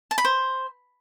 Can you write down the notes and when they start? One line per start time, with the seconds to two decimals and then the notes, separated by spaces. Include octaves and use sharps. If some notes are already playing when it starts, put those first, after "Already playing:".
0.11 A5
0.18 B5
0.25 C5